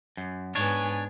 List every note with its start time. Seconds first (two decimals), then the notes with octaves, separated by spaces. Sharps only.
0.17 F#2
0.55 G#2 B3 D4 C#5 G#5